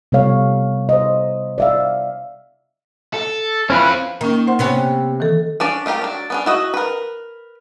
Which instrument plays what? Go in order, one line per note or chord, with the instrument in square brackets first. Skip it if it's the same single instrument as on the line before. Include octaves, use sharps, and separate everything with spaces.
[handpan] C3 G3 B3 A4 C#5 F5
C5 D#5
D5 E5 F5
[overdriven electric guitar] A4
[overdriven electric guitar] C4 F4 [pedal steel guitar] C#4 E4 B4
[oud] D#3 [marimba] A#3 C#4
[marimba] C5 F#5 C6
[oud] C3 B3 C#4
[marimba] D#3 E3 A4
[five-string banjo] C#4 D4 D5
A3 F4 G4 A#4
F#3 D4
B3 C#4 D4
E4 F#4 D#5
A#4 B4